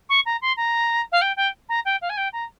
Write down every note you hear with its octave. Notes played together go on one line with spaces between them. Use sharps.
C#6
A#5
C6
A#5
F5
G5
G5
A#5
G5
F5
G#5
G5
A#5